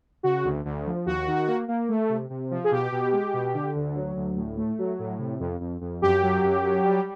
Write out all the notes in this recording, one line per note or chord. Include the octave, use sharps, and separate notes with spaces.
C#3 F#4
D2
D2
F3
D#2 F#4
D#3
A#3
A#3
A3
C3
C3
F3
G#4
B2 G4
B2
G#3
B2
D3
D2
F#3
D2
A2
A3
F#3
A2
C3
F2
F2
F2
F#2 G4
F#3
F#2
F#3
G3